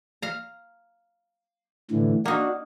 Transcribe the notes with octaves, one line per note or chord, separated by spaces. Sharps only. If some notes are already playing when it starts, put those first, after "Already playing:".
F5 A#5
A2 D3 E3
A#3 D4 D#4 F#4